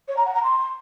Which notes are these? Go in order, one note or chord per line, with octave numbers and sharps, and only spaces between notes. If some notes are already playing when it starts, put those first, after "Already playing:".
C#5
A#5
F#5
A#5
C6